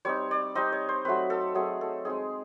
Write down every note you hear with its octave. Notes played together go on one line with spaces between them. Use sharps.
G3 C4 D#4 C#5
D5
G3 C4 D#4 D#5
C#5
C5
F#3 A3 C4 B4
A4
F#3 A3 C4 G#4
A4
G#3 C4 D#4 G#4